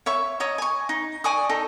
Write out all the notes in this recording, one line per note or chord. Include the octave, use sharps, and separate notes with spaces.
C#5 E5 C#6
C#5 D#5 A#5
G#5 C#6
D#4
D5 G#5 C#6 D#6
D#4 A4